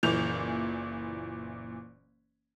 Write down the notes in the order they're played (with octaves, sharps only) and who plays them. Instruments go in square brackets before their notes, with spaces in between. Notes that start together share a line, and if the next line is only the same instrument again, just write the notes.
[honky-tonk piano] F#1 A#2 E3 G6 F7